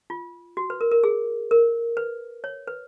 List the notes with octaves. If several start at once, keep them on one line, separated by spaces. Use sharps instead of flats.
F4
F#4
B4
A#4
A#4
G#4
A#4
B4
C#5
B4